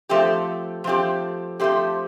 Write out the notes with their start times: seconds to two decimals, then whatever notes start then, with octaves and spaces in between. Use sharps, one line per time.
0.09 F3 A3 C4 G4
0.84 F3 A3 C4 G4
1.60 F3 A3 C4 G4